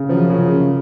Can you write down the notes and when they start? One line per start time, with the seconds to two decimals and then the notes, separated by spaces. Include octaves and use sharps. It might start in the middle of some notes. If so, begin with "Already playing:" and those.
Already playing: C#3
0.09 F#2 F3
0.30 C#3
0.52 C#3